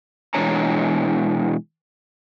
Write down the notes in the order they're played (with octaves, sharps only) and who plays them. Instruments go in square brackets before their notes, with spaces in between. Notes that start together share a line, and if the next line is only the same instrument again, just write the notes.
[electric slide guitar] B2 E3 G#3 D4 C#5 A#5